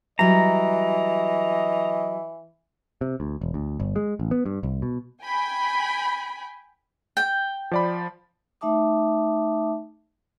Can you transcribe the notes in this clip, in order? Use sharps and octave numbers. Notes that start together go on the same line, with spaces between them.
E3 F#3 G3 D#5 A#5
C3
D2
E1
D2
G1
G#3
A1
B3
G2
C2
B2
G5 G#5 B5
G5
F3 D5 B5
A3 D#4 E5 A5 D6 D#6